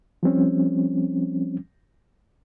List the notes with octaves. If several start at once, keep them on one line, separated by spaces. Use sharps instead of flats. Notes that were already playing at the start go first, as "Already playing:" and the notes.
F3 G3 C4 C#4